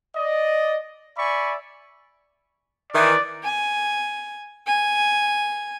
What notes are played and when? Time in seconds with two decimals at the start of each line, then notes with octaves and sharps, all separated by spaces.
0.16 D5 D#5
1.18 D5 E5 G#5 B5 C#6
2.93 D#3 E3 D5
3.44 G#5
4.66 G#5